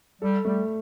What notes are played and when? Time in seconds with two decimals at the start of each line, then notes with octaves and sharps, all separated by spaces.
0.22 G3 A4
0.45 G3 A3